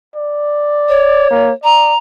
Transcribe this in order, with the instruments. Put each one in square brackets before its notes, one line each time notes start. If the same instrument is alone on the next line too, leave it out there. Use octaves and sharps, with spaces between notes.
[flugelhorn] D5
[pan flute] C#5
[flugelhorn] A#3
[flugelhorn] D5 [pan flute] A#5